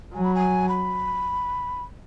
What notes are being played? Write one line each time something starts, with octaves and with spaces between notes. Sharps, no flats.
F#3 G#5
B5
G#5
B5